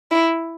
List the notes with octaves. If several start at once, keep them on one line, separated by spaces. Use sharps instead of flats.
E4